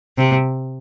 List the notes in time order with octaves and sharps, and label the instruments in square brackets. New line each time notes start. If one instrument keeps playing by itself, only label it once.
[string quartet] C3